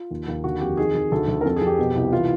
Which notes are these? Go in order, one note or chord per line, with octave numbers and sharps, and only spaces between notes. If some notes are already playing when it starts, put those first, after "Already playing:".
Already playing: F4
D#2
D#2
D3 F#4
F2 G4
D#3 G#4
D#3
D2 A4
D2
A#4
F2 A4
F2 G#4
G4
B2
C2
E3 F4